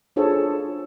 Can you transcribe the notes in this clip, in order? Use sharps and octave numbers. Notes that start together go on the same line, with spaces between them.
D4 F4 G#4 A4 C5 C#5